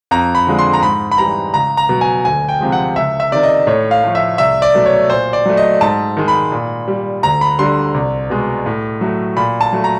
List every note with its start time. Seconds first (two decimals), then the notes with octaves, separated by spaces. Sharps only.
0.11 F2 A#5
0.35 B5
0.47 D3 F3 G#3
0.59 C6
0.73 A#5
0.82 G#2 B5
1.12 B5
1.18 E3 G3 A#5
1.54 C#2 A#5
1.77 A#5
1.89 B2 F#3
2.01 G#5
2.25 D2 G#5
2.48 G5
2.61 C3 F3 G#3
2.72 F#5
2.96 C#2 E5
3.20 E5
3.32 C3 D#3 D5
3.43 D#5
3.67 A2 C#5
3.91 F5
4.03 F3 A3
4.15 E5
4.38 C2 E5
4.62 D5
4.74 B2 F#3 A3
4.86 C#5
5.10 A#2 C5
5.33 D5
5.46 F#3 A3
5.57 D#5
5.81 G#2 A5
6.17 D#3 G#3
6.28 B5
6.52 A#2
6.88 G3
7.23 D2 A#5
7.41 B5
7.59 D3 G3 C6
7.94 C2
8.30 B2 G#3
8.66 A2
9.01 F#3 A3
9.37 A#2 B5
9.61 A5
9.73 F#3 A3
9.84 A#5